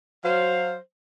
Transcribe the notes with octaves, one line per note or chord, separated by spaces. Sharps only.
F#3 C5 F5